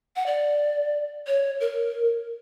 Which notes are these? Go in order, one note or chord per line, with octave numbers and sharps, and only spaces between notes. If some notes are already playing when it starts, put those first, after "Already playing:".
F#5
D5
C#5
A#4